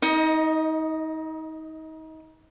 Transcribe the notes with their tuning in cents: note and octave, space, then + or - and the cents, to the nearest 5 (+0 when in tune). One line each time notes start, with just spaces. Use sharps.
D#4 +30 D#5 +0